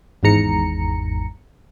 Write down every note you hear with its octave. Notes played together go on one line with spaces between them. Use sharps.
G#1 E2 G#2 A#5 C#7